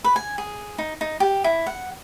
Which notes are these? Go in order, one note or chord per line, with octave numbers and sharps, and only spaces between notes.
B4
G#5
G#4
D#4
D#4
G4
E4
F#5